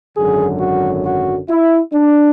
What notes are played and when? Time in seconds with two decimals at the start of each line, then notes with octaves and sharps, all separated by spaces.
0.16 G#1 F#2 D3 F#3 G#4
0.60 F#4
1.04 F#4
1.48 E4
1.93 D4